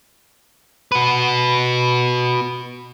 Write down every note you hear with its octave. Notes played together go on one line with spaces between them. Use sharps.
F#4 B4